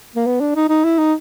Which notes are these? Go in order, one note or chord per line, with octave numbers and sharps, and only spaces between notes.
A#3
B3
D4
D#4
D#4
E4
D#4